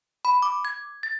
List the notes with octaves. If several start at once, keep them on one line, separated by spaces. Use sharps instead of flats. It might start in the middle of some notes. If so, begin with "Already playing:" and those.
B5
D6
G#6
A6